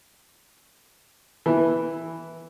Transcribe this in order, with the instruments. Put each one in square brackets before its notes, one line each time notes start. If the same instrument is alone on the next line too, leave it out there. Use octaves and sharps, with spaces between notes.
[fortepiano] E3